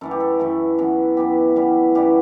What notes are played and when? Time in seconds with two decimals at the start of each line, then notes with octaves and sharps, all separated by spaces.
0.01 F#2 E3 A3 A4
0.11 G4
0.20 A4
0.39 F#2 E3 A3
0.78 F#2 E3 B3
1.17 F#2 E3 B3 G4
1.56 F#2 E3 G3 B3
1.95 F#2 E3 G3 B3 G4